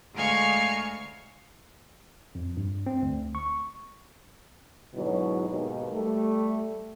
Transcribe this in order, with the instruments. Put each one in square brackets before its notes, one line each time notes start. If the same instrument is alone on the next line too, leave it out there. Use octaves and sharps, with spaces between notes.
[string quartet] D2 G#3 F5 G#5 C#6 F6
[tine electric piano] F2
G2
C4
D2
C#6
[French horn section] G#2 B2 D3 F#3 E4
D#2 G#2 B2
G3 A3